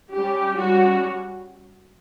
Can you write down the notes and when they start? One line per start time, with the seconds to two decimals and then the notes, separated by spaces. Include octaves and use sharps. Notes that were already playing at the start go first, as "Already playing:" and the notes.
0.13 G3 C#4 G4
0.58 G3 C#4 F#4